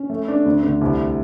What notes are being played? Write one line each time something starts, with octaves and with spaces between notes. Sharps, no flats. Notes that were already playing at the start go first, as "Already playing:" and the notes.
Already playing: C#4
A3
D4
D2
D2
C2